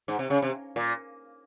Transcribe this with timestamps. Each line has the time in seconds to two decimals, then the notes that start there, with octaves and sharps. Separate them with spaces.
0.08 G#2
0.19 C3
0.30 C#3
0.42 C3
0.76 A#2